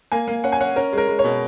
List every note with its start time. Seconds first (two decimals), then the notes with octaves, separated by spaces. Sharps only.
0.12 A#3 G#5
0.28 A#3
0.44 C#4 F#5
0.52 G#5
0.61 C#4 F#5
0.76 C#4 A#4
0.93 G#3
0.98 A#4
1.08 G#3
1.19 C#5
1.24 B2